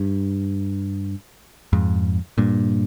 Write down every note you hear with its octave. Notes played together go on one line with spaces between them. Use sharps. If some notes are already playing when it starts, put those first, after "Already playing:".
Already playing: G2
F2 G#2
G2 A#2